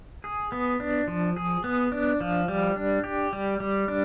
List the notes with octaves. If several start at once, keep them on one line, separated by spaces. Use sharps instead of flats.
G#4
B3
D4
F3
G#4
B3
D4
F3
G3
D4
G4
G3
G3
D4